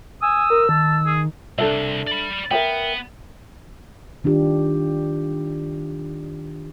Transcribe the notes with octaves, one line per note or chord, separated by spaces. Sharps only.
G#5 D#6 E6
A#4
D#3 A5
G#4
C2 D4 A4 E5
D5 B5
B3 A#4 E5 G5
D#3 D4 F4 G4